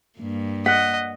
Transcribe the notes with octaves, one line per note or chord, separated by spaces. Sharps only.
G2 A#3
D#5 F#5 F#6 B6